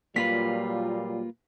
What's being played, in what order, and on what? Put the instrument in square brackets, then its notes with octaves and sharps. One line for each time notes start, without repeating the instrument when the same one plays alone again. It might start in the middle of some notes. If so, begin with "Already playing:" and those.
[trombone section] A#2 F#3 G3 [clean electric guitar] A#3 F4 B4 [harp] B6